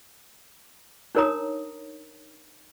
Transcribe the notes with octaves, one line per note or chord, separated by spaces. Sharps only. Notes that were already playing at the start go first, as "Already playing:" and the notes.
D4 D#4 A#4 C#5 A#5 D#6